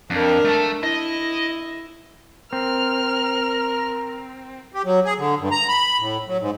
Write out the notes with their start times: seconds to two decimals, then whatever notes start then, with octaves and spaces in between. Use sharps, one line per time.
0.10 F2 D4 A#4
0.45 A3 A5
0.83 E4 D#5
2.53 C4 A#4 F6
4.72 G4
4.85 F#3
5.05 G#4
5.18 D3
5.39 G2
5.51 A#5
5.68 B5
5.99 A2
6.27 F#3
6.40 G#2